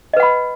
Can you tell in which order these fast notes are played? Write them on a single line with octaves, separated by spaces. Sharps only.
D#5 B4 F#5 B5